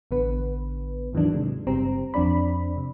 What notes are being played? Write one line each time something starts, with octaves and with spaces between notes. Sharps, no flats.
A1 D3 B3 B4
D#2 G#2 D#3 E3 F#3 D4
C3 G#3
G1 G2 C#3 C4 G4 A#5
F2 C4 D4 D5 B5
C3